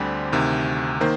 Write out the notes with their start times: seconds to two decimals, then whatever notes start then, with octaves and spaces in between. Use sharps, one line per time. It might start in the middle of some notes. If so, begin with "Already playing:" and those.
Already playing: D2 D3 G3 C4
0.32 D2 C3 D#3
1.01 D#3 A#3 C5